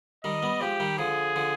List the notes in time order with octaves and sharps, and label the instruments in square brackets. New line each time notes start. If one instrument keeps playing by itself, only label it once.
[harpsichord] D#3 G3 [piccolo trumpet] D#5
[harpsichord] G3 B3
[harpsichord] F3 G#3 [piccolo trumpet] G4
[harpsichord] D#3 G3
[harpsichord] D3 F3 [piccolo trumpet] G#4
[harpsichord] D3 F3